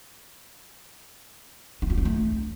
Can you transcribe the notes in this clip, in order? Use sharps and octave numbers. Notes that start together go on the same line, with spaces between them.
D#4
F4
D4
A3